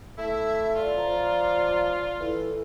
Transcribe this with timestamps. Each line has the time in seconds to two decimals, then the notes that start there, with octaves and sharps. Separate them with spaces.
0.18 A3 E4 E5
0.76 F4 D5
0.97 F3 A#5
2.20 E3 A4